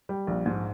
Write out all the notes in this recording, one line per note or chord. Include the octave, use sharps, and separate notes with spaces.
G3
A#1
G#2